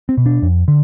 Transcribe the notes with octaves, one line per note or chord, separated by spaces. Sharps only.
C4
B2
D4
F2
D3